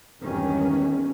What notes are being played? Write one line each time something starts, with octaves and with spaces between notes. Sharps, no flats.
G#1 E2 G2 D#3 C#4